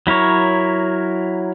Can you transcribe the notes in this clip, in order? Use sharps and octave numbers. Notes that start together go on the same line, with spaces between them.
F#3 E4 A#4 C#5